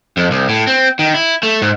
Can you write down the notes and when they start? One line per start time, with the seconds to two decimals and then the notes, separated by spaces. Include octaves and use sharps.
0.17 F2
0.31 C2
0.49 A2
0.67 C4
0.99 D#3
1.14 E4
1.43 A3
1.62 G#2